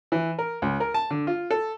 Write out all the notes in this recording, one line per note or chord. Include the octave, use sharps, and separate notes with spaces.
E3
A#4
C#2
A#4
A5
D3
F4
A4